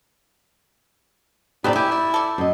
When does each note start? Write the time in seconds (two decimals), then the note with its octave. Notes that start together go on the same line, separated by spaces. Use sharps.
1.64 B3 C4 D4 D#4 G4 D5
1.76 E4 G4 G#5
1.92 D5
2.14 A4 D5
2.38 F#2 D#5